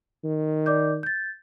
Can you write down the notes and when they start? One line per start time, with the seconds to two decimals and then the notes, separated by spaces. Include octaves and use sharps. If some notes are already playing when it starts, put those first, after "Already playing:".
0.24 D#3
0.66 D5 D6 G6
1.03 G6 A6